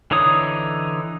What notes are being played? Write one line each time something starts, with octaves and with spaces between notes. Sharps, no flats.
D3 E3 D#4 C#5 D#6